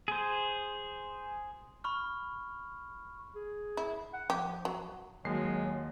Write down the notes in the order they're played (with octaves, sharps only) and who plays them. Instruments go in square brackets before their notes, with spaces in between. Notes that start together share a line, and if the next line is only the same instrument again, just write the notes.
[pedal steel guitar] G#4 C5
[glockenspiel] B5 C#6 F6
[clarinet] G#4
[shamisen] E4
[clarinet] F#5
[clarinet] F3 [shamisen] G4
[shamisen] F#3
[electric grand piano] D#2 C7 [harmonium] F#3 [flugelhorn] G#3